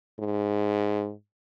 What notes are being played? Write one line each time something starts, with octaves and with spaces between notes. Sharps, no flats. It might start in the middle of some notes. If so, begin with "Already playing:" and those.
G#2